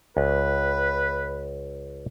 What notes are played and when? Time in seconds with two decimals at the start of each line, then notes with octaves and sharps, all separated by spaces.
0.17 C#2 B4